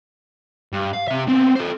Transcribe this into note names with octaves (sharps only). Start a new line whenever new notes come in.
G2
F5
C3 E5
B3 C4
A4 C5